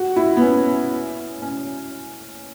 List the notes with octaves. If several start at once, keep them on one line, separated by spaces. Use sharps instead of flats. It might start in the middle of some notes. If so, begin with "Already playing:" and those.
Already playing: F#4
E4
B3
C#4
C#4